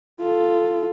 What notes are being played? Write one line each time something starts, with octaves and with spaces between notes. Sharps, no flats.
F4 A4